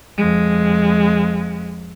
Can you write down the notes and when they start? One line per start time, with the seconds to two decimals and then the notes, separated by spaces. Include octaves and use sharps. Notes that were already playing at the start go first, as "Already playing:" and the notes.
0.17 F2 G#3